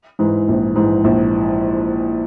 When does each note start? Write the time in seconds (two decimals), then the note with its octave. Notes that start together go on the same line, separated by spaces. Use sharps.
0.19 G#2 E3
0.48 A#1
0.76 G#2 E3
1.04 A#1